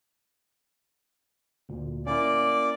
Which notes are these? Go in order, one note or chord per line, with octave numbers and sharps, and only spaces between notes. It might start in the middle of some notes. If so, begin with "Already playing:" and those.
D2 A#2
A#3 C#4 E4 D5